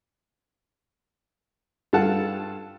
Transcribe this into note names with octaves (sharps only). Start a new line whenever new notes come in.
G2 F4 A4 F#5 A5